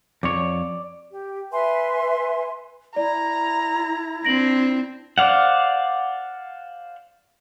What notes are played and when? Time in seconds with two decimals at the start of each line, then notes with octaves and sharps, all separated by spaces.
0.23 F2 C#5 D5
1.10 G4
1.52 B4 E5 G#5 C6
2.96 E4 D5 A#5
4.25 C4 D4 A#6 D7 F#7
5.18 C5 D5 F5 F#5